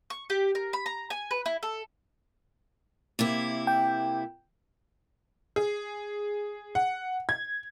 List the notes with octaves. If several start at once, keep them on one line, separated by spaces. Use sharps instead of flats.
C#6
G4
A#4
B5
A#5
G#5
B4
E4
A4
C3 A#3 E4
G5
G#4
F#5
G#6